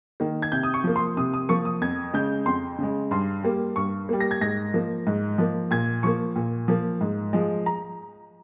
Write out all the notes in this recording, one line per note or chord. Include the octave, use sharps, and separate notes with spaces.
D#3 A#3
G#6
C3 G6
D#6
C#6
F3 A#3
C6
C3 D#6
D#6
F3 A#3 C#6
D#6
F2 G#6
C#3 G#3 G6
F2 C6
C#3 G#3
G2 C6
G3 A#3
G2 C#6
G3 A#3
A#6
G#6
G#2 A#6
F3 A#3
G#2
F3 A#3
A#2 G#6
F3 A#3 C#6
A#2
F3 A#3
G#2
F3 G#3
A#5